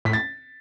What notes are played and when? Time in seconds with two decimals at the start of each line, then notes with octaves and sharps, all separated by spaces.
0.05 A2 B6
0.13 A6